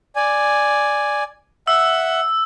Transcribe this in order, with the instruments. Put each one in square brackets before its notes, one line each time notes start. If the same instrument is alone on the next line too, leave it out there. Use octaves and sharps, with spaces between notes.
[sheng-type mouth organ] D5 G#5
[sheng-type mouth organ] E5 F#5 [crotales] E6